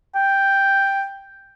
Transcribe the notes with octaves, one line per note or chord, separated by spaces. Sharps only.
G5